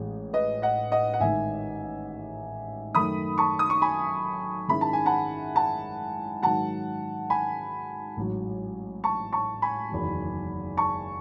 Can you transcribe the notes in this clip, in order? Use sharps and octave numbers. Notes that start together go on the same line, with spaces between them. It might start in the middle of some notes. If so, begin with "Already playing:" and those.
Already playing: A1 A2 E3 G#3
B4 D#5
D#5 F#5
D#5 F#5
F#5
A1 G#2 D#3 E5 G#5
F#2 D#3 A3 B5 D#6
A5 C#6
D#6
C#6
G#5 B5
G#2 D#3 G#3 C#4 E4 B5
A5
G#5
F#5 A5
F#5 A5
G#2 D#3 F#3 F#5 A5
G#5 B5
A1 G#2 F#3
A5 C#6
A5 C#6
G#5 B5
F#1 E2 D#3 F#3
A5 C#6